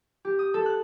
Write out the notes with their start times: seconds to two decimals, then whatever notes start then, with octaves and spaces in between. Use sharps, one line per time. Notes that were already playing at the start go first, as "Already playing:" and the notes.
0.25 G4
0.39 D#6
0.54 A4
0.66 F#6